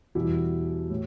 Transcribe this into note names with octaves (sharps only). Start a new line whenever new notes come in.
E2 B2 G3 E4 G4
A2